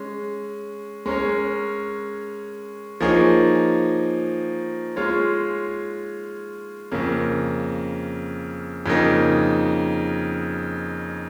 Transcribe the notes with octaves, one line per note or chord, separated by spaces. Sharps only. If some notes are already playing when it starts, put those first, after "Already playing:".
Already playing: G#3 C#4
G#3 C#4 A#4 C#5
F3 A#3 D#4 G#4 C#5
G#3 F4 C#5
F2 C#3 A#3
F2 C#3 A#3 D#4